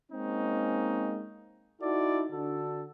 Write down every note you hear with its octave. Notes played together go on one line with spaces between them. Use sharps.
G#3 A#3 C4 C#4 D#4
D#4 E4 F#4 A4 D5
D3 D4 F#4 A4